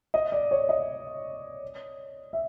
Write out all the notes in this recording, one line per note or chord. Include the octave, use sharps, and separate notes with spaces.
D#5
D5
C#5
D#5
E5